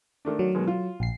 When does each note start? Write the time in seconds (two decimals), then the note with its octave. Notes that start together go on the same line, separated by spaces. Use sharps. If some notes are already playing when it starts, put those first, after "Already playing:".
0.25 D#3 A3 D4
0.39 F#3
0.55 B2 D#3 G#3
0.67 F4
1.00 A#1 C7